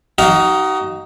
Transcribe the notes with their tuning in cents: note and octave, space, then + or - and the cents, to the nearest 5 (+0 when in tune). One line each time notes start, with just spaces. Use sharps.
D#4 +0 F#4 +40 F5 +10